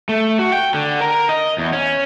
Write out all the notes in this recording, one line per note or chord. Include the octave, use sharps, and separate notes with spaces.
A3
F#4
G5
D3
A#4
D#5
E2
C#4